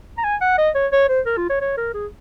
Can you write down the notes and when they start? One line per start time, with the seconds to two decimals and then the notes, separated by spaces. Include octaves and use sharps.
0.18 A#5
0.24 G#5
0.41 F#5
0.58 D#5
0.75 C#5
0.92 C#5
1.09 C5
1.26 A#4
1.37 F4
1.50 C#5
1.61 C#5
1.78 A#4
1.94 G#4